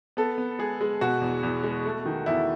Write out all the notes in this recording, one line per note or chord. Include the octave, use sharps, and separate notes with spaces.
B3 A4
B3
G#3 G#4
G#3
B2 F#4
E2
E2
G#3
A3
D#3
E2 E4